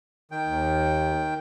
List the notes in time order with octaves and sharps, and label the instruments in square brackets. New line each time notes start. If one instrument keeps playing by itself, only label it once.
[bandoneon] D#3 G5
[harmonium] D#2